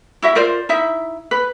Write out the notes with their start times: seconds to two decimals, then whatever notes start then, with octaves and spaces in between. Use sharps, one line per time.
0.22 E4 F#4 E5
0.35 F4 A#4 C5 D5
0.69 D#4 E4 E5
1.31 B4